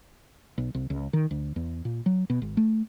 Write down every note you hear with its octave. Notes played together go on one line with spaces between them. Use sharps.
B1
C2
C#2
D#3
D2
E2
A#2
F#3
B2
G#1
A3